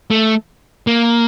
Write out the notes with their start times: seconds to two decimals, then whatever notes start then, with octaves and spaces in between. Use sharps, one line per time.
0.11 A3
0.87 A#3